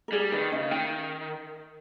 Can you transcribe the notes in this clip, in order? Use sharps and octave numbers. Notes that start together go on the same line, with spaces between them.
A#4
G3 G#4
D#3 B4
C#3 D#5
D#3 G5